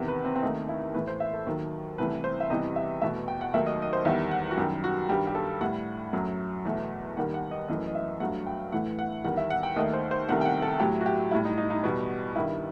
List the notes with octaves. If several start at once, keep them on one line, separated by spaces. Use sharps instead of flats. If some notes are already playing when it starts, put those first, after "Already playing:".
Already playing: E2 C3 D#3
B4
C4
C4
D#2 D#3 A3 D#4
E4
A2 E3 A3 B4
C5
E5
A4
D#2 D#3 F#3
C2 C3 E3 A3 B4
C5
E5
E2 C3 E3 G3 D#5
E5
E2 B2 A3 E5
G5
F#5
D#2 D#3 F#3 A3 E5
D#5
D#5
C5
E2 D#3 G3 E5
F#5
F#4
F#2 D#3 G3 G4
F#4
G2 D#3 G3 G4
G4
A4
A2 G3 F#5
F#2 F#3 A3
E2 B2 A3
D#2 D#3 G3 F#5
F#5
D#5
F#2 E3 A3 D#5
D#5
E5
G2 F#3 A3 F#5
G5
A2 E3 A3 F#5
F#5
E2 D#3 G3 F#5
E5
F#5
G5
D#2 D#3 A3 D#5
C5
C5
C2 C3 D#3 A3 F#5
G5
F#5
A4
A2 F#3 A3 G4
F#4
G4
A2 G3 E4
D#4
D#4
D#4
E2 B2 G3
G2 D#3 G3 E4